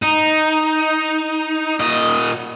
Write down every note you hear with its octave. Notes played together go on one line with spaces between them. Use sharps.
D#4
A#2 D#5